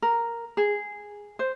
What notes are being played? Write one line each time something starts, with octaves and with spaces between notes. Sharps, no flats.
A#4
G#4
C5